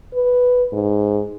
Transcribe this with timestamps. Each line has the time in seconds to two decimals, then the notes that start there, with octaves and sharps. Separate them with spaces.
0.14 B4
0.73 G#2